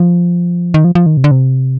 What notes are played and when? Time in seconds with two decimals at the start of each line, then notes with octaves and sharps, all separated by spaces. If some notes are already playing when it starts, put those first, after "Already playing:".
Already playing: F3
0.74 D#3
0.84 F3
0.95 F3
1.06 D#3
1.17 C3
1.24 D3
1.31 C3